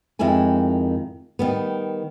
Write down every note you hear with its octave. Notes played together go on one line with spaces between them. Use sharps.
F2 D#3 G#3 E4 G#5
D#3 G3 B3